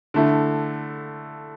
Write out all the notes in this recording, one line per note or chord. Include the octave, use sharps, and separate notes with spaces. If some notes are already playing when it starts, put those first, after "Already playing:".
D3 A3 E4